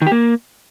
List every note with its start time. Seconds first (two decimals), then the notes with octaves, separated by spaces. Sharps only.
0.02 D#3
0.07 G4
0.12 A#3